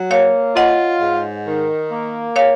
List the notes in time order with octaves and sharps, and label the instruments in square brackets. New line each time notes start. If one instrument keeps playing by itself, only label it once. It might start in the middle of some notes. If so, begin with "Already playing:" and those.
Already playing: [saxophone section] F#3
[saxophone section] A#3 [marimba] C#5 F5
[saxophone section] F4 [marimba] D#5 F#5
[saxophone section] G#2
D#3
A#3
[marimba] C#5 F5